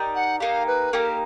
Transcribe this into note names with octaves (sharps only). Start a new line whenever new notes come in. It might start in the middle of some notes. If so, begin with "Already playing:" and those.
Already playing: D#4 G4 A#4 D5
F#5
A#3 D#4 G4 F5
B4
A#3 D#4 G4 A#4